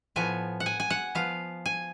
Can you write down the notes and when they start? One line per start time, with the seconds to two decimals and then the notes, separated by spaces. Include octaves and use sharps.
0.16 A2 F3 B3 G#5
0.60 F#5
0.66 G#5
0.80 G#5
0.90 F#5
1.15 F3 B3 F5
1.66 G#5